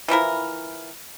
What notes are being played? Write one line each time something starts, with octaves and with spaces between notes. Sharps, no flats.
E3 F3 E4 A#4